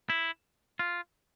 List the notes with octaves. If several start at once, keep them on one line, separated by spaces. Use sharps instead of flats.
E4
F4